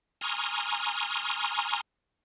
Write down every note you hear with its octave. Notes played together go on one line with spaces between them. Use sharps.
G#5 A#5 C6 C#6 D#6 F6